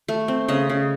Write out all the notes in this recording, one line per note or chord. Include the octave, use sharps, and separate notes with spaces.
A3
C4
C#3 D#5
C#3